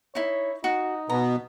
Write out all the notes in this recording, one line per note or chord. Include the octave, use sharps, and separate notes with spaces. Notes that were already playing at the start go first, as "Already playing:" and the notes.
D#4 E4 C#5
D#4 F#4
B2 B3 A#5